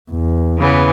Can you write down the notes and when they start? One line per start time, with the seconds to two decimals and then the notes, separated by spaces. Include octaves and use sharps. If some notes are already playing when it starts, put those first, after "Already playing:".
0.11 E2
0.58 C#3 E3 B3